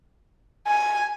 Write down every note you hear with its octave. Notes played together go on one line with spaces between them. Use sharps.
G#5